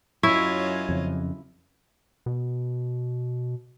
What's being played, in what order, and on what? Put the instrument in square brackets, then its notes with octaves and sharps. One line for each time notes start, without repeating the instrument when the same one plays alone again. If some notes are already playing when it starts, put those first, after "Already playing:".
[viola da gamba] F#2 F4 D#5 [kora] E4 [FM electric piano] C#5 G#6
[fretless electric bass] F2 C#3
[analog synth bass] B2